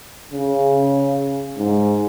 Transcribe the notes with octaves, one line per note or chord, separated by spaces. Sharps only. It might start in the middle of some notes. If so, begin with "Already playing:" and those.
C#3
G#2